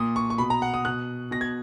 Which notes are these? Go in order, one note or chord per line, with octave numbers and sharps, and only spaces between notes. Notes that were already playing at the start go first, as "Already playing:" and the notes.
Already playing: A#2 D#6
C#6
C#6
B2 B5
A#5
F#5
D#6
B2 F#6
B2 A#6
G#6